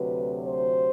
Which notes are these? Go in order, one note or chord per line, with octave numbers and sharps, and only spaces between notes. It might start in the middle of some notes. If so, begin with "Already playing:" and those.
Already playing: D2 C3 F#3 B4
C5